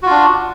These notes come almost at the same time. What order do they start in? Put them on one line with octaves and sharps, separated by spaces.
F#4 F4 D4